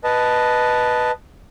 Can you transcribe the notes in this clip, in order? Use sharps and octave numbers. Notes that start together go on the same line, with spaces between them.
B4 D#5 A5